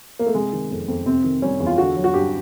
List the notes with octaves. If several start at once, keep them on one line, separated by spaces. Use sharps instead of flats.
A#3
A3
C3 G#3
D#3
F2
F2
C3 C4
D#3
G3 C#4
E2
F4
D3 F#4
F#3
F#4
G2 G4